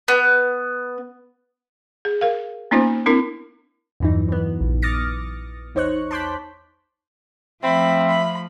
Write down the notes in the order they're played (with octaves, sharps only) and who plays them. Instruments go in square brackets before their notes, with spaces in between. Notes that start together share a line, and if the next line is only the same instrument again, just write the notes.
[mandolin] B3
[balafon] G#4
A#4 F5
A#3 B3 C#4 D#4 F4 C5
C4 D4 E4 A#4
[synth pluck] E2 G2 E3 F#3 D#4
E3 B3
A#1
D6 D#6 F6 A6 A#6 C#7
E2 D#4 C5 C#5 C#6 F#6
A5 C6 D6 F#6 G6 B6
[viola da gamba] F3 A3 [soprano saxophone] C4 [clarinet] E5 [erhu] B5
[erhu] B5